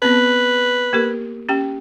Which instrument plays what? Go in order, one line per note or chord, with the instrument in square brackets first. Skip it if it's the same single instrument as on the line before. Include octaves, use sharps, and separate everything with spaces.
[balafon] B3 C4 [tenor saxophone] B4
[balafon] A#3 G4 A#4
C#4 G4 G5